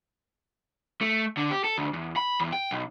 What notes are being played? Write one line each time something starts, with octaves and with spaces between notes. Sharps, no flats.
A3
D3
G4
A4
D2
E2
B5
E2
G5
B1